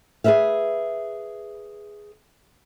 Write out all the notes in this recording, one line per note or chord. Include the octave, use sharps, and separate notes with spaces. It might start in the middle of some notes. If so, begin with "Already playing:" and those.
G#4 A4 B4 E5 F5